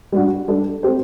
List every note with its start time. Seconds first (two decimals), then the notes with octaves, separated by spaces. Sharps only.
0.12 G3 D4 F#4
0.48 G3 D4 A4
0.83 A3 C4 G4 C5